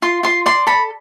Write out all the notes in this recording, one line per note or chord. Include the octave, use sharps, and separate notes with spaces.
F4 C6
F4 C6
D5 C6
A4 B5